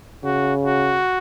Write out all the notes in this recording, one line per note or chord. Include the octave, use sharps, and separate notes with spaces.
C#3 F#4
F#4